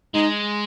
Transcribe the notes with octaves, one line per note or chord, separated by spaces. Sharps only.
G#3 D#4